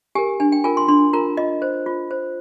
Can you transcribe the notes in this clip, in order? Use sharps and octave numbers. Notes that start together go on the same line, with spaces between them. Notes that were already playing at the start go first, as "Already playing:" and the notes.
G4 A#4 G#5
D4 G#5
G5
F4 A#4 G#5
C6
D4 C6
F4 A#4 A#5
F4 D#5
C5
F4
C5